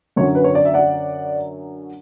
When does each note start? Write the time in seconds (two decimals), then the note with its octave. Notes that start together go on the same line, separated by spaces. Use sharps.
0.16 F#2 D3 F#3 C#4 C#5
0.35 B4
0.44 C#5
0.55 D5
0.65 E5
0.74 D5 F#5